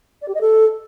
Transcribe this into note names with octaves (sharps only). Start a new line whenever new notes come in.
D5
G4
D#5
A4